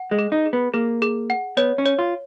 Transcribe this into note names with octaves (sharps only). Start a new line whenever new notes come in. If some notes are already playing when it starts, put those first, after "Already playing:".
Already playing: F#5
G#3
G#4
D#4
G#4
B3
A#3 G#4
G#4
F#5
B3 C#5
C#4
C#5
F4